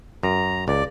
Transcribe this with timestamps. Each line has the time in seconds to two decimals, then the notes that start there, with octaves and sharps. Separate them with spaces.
0.23 F#2 A#5
0.68 C#2 D5